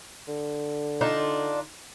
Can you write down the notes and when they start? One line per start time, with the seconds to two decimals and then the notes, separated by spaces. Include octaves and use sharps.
0.28 D3
1.01 D4 D#4 F4